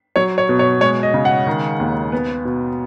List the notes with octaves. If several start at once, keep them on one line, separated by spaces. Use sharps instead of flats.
F#3 C#5
C#5
B2
C#5
G#3 C#5
D#5
C#3
F#5
D#3
D#2
B3
B2